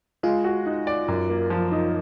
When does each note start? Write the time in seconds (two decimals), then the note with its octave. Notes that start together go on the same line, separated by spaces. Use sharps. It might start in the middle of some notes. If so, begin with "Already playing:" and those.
0.23 G#3 F4
0.44 F#4
0.66 D#4
0.87 D5
1.08 F#2
1.30 A#3
1.50 F3
1.72 D#4